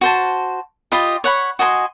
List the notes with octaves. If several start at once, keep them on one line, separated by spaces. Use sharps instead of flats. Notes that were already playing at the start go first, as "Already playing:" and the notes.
F#4 C5 A5
F4 G4 D#5 B5
C#5 F#5 B5
F#4 D#5 G#5 C6